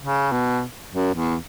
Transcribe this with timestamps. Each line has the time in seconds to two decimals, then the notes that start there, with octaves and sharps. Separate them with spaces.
0.01 C#3
0.32 B2
0.91 F#2
1.13 E2